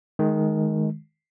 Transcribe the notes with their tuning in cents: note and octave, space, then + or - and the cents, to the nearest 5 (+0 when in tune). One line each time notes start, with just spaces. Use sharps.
D#3 +0 G#3 +20